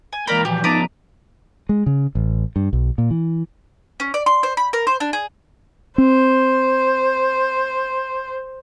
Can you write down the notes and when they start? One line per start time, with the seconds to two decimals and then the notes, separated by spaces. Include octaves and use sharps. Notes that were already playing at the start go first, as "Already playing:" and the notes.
0.13 G#5
0.27 E3 G#3 A#3 A#4 D5 G5 A#5 B5
0.45 A#2 E3 F3 F#4 G4
0.64 F3 B3 D#4 B4 A5 A#5 D6
1.69 G#3
1.86 C#3
2.15 A1
2.56 G2
2.73 B1
2.98 A#2
3.11 E3
4.00 C#4
4.14 D5
4.26 C6
4.43 C5
4.57 B5
4.73 A#4
4.87 C5
5.00 D4
5.13 G#4
5.98 C4 C5